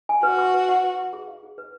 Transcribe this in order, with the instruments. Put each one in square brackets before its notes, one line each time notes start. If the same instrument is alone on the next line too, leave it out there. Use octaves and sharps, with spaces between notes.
[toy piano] G#5
[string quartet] F#4 [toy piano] B4
[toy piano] C#6
B4
F#5
B4
C#6
G#4
F5
G#4
B4